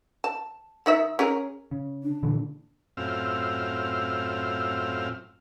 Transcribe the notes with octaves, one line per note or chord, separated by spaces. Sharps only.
A5
D#3 D#4 E5
C#4 G#4 A#4
C#3
D4
A#2 D3 E3
F#2 A2 C4 F4 E6 F6